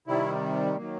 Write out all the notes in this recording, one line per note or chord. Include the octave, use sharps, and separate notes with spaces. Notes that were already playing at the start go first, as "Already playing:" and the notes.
C3 D#3 G3 E4
D#3 F#3 A#3